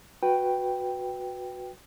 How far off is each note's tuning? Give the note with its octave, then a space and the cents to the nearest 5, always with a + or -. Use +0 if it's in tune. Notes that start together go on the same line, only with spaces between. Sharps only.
F#4 -15 B4 +0 G5 +0